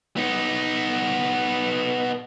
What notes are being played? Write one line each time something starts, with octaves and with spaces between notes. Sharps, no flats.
B3 D#4